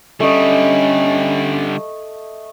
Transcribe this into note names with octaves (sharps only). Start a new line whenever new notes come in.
D3 G3 A3 C#4 D#5